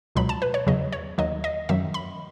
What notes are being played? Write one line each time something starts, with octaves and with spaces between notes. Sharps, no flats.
C#2 B2 F#3 B5
A5
B4
C#5
E2 C#3 F#3 D#5
C#5
D#2 D#3 F#3 D#5
D#5
F#2 D#3 F#3 E5
B5